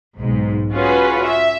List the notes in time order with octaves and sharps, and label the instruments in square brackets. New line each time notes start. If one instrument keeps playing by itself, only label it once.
[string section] B1 G#2
C#4 F4 F#4 G#4 B4
E5